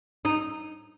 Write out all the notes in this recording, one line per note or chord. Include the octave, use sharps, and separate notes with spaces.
D#4